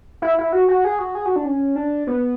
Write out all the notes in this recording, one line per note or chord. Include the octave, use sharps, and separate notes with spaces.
E4
E4
F#4
F#4
G#4
F#4
G#4
F#4
D4
C#4
D4
B3